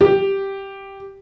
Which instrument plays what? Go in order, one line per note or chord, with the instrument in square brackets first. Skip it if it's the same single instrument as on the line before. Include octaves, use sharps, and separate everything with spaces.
[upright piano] G4